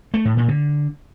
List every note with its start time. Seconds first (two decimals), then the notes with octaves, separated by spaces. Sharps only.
0.14 A3
0.25 A2
0.37 A#2
0.48 D3